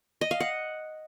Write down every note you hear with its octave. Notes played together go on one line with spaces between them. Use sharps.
D#5
F5
F#5